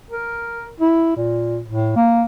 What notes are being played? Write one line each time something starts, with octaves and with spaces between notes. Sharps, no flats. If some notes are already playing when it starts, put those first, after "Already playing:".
A#4
E4
A#2
A2
A#3